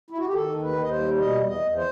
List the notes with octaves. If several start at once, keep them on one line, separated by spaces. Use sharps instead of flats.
E4
F#4
G4
D#3 A4
D#2
B4
D#2
D#5
C5
G3
B2 D#5
E2
D#5
E2
C5